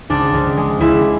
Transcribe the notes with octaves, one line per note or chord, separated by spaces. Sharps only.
C#2 D4
C#2
G#3
C#2 E4